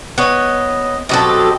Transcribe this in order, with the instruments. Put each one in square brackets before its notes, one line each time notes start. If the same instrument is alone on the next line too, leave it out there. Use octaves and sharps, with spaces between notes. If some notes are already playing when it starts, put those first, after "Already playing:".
[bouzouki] B3 C#5 [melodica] D#5
[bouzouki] B2 F#3 A4 [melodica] C4 G4 D#5